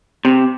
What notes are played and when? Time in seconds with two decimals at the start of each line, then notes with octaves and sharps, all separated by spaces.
0.25 C3